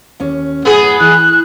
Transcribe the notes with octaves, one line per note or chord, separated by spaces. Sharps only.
D#2 C#4
F#2 A2 B3 G#4 F#5
E3 F#6